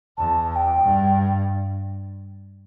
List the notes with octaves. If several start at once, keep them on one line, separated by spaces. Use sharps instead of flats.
E2 A5
A5
G5
G2